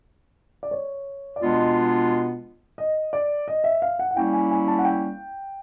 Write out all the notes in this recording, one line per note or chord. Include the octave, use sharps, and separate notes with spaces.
D5
C#5
D5
B2 G#3 B3 D4 F4 D#5
D#5
D5
D#5
E5
F5
F#5
F#5
G3 A#3 C#4 E4 G5
G#5
G#5
A5
F#5
G5